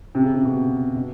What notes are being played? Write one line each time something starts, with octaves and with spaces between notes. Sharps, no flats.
C3
C#3
C3
B2
B2